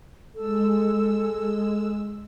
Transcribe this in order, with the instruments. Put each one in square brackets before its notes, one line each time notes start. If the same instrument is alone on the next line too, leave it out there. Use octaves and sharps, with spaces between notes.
[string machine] G#3 E6 [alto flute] A4